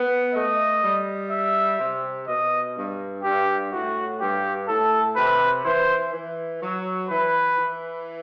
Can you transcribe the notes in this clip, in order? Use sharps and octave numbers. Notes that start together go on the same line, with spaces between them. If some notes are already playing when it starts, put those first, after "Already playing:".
Already playing: B3
A3 D#5
G3
E5
C3
B2 D#5
G2
G2 G4
A2 F#4
G2 G4
A2 A4
C3 B4
E3 C5
E3
F#3
E3 B4
E3